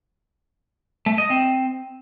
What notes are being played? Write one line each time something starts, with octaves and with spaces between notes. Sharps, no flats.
A3
D#5
C4